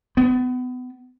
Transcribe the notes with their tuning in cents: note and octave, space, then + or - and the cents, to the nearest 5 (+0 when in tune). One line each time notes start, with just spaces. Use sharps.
B3 +30